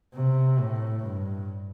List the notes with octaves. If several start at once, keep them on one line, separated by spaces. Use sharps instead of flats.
C3
A2
G2